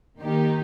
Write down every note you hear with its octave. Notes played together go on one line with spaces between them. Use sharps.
D#3 A#3 D#4 G4